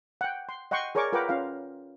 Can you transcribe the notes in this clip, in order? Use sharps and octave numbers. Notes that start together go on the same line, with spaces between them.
F#5 G5
C6
D#5 F#5 G5 C6 C#6
G#4 A#4 C#5 D5 C#6 D6
F4 A#4 B4 F#5 G5 D6
C#4 F4 F5